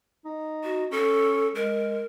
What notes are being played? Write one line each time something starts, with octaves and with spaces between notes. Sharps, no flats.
D#4
F#4
C#4 A4
G#3 A#4